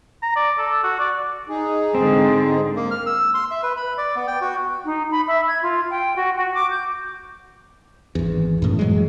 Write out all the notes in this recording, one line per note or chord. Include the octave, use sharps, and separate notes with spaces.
A#5
D5
A4
F#4
D5
D#4 G#4
G#2 D3 C4
A#3
F6
E6
C6
E5
B4
B5
D5
B3
G5
F#4
D#4
B5
E5
G#6
F4
G5
F#4
F#4
D6
G6
G#1 E2
F#2 A2
E3 F#3 G#3